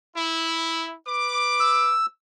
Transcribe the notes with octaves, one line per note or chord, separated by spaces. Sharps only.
E4
B4 D6
E6